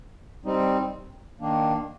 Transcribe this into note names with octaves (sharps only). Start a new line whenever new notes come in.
G3 C4 D#4
D#3 A#3 D4